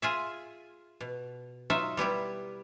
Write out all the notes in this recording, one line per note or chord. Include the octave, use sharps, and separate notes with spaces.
F4 G#4 E5
B2
F#3 D#4 F4 E5
G3 B3 E4 G4